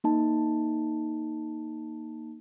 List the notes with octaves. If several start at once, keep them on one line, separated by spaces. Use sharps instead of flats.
A#3 D#4 A5